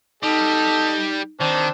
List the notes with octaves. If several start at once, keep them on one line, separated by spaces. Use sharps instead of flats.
G3 D#4 A4 D#5
D#3 C4 D4